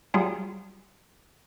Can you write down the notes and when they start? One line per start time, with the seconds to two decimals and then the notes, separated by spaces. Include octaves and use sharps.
0.14 F#3 G3 F4 G#4